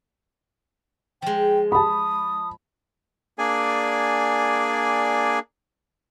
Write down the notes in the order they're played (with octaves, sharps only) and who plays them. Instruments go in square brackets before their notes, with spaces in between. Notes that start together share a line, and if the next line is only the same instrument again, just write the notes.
[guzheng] F3 G#3 [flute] G5
[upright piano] A5 B5 [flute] D#6
[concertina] A#3 D4 G#4 D5 G#5